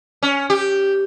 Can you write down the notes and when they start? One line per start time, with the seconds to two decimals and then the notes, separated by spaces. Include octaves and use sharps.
0.23 C#4
0.50 G4